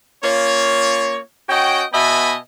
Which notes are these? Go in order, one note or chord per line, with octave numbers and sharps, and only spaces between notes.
A#3 C#4 F4 C#5
C#4 F#4 D#5 G5
B2 B3 D#5 E5 G#5 B5